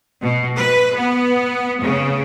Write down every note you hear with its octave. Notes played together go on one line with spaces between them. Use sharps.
B2
B4
B3
C#3